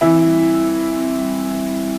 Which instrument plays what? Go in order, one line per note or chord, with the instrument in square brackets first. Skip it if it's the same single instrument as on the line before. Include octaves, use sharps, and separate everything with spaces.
[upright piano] E3 E4 [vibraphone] C4
[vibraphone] G3
G3
G3
C4
G3
G3
G3